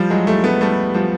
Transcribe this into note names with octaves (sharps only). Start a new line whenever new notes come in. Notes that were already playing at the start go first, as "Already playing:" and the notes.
Already playing: F3 G3
F#3 G#3
G3 A3
A3 B3
G3 A3
F3 G3